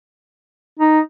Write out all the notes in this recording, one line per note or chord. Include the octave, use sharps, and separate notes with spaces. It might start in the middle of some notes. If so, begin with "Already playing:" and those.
D#4